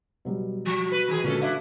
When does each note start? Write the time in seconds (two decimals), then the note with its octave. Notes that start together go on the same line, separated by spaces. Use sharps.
0.25 B2 F#3 G3
0.66 F3 F#4
0.92 B4
1.08 D#3 E3 G#4
1.24 A#2 D3 G#3 A3 C#4 A4
1.42 D4 E4 E5 F5